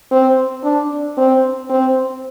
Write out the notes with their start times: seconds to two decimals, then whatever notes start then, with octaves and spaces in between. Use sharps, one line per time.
0.12 C4
0.64 D4
1.18 C4
1.70 C4